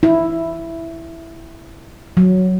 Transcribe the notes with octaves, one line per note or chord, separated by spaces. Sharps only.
E4
F#3